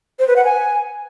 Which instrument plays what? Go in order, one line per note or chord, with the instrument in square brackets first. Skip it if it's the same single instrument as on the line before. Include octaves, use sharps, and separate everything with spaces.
[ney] C5
B4
F#5
G#5